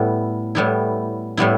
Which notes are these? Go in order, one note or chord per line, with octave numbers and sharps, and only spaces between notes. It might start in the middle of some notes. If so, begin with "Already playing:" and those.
Already playing: A2 G3 B3 E4
A2 G3 B3 E4
A2 G3 B3 E4